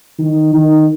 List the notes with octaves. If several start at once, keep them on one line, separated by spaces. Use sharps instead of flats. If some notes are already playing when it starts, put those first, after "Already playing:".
D#3
D#3